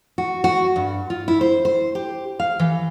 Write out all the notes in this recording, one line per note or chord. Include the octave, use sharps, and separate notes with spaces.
F#4
F#4
G2
F4
E4
C5
C5
G4
F5
E3